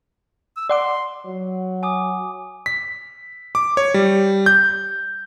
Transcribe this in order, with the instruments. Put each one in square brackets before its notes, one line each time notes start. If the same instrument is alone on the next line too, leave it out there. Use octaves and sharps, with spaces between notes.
[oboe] E6
[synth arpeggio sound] D5 F#5 D6 [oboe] C6
[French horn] F#3
[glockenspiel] G#5 D6 D#6
[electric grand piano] B6
D6
C#5
G3
G6